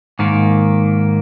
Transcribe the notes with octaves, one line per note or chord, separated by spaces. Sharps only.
G#2 D#3 A#3